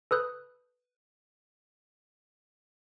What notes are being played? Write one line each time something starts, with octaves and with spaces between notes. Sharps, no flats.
A4 B4 D#6 F#6 G6